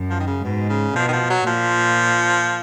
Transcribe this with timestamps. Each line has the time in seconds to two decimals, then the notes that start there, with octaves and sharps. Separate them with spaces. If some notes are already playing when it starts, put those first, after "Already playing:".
Already playing: F#2
0.10 F3
0.20 D#3
0.27 C#3
0.44 G#2 B2
0.69 C#3
0.96 B2 F3
1.09 D#3
1.13 F3
1.30 F#3
1.47 A#2 F3